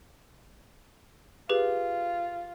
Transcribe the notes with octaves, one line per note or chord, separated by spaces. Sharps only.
F4 G4 G#4 B4